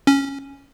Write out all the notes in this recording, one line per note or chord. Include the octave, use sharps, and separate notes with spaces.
C#4